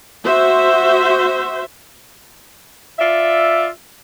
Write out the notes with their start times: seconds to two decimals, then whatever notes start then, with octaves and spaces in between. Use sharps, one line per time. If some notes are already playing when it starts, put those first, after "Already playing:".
0.25 F#4 C5 E5
2.99 F4 D5 E5